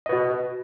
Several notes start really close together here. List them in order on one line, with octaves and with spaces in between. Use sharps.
D#5 B4 F#4